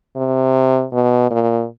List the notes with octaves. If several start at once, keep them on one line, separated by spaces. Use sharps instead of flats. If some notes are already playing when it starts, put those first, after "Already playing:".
C3
B2
A#2